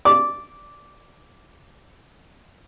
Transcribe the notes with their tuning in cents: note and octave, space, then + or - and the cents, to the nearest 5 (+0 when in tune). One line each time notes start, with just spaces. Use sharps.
D5 +0 D6 -10